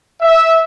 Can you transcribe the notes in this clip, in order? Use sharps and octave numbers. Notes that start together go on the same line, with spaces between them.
E5